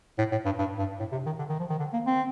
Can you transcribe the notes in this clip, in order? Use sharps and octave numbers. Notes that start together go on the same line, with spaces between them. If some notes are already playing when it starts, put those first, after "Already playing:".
A2
A2
G2
G2
G2
A2
C3
D#3
D3
D#3
F3
D#3
D3
A#3
C4